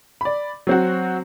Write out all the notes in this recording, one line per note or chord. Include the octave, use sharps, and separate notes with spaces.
D5 B5
F#3 C4 F#4